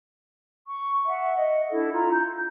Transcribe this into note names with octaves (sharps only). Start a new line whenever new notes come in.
C#6
E5 F#5
D#5
D4 E4 A4
F4 A#5
G6